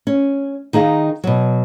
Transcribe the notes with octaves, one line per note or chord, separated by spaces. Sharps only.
C#4
D#3 D#4 G#4 F5
B2 F#3